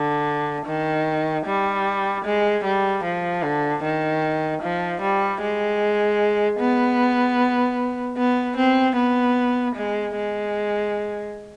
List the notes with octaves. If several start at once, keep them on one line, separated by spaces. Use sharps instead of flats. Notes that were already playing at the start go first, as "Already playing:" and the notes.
Already playing: D3
D#3
G3
G#3
G3
F3
D3
D#3
F3
G3
G#3
B3
B3
C4
B3
G#3
G#3